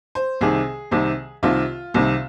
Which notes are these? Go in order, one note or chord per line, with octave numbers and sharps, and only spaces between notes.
C5
C2 C3 D#3 G#4
C2 C3 D#3
C2 C3 D#3 F4
C2 C3 D#3